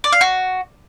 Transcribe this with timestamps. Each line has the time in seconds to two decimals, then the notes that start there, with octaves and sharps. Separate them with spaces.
0.04 D5
0.12 F5
0.21 F#4